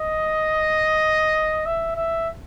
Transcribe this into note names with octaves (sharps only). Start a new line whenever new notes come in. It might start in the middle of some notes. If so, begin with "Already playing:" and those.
Already playing: D#5
E5
E5